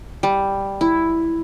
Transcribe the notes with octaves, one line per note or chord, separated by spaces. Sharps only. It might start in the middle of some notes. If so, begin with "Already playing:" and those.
G3
E4